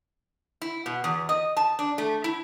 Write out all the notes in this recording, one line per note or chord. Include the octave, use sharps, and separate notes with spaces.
E4
B2
E2
D#5
A5
D4
A3
E4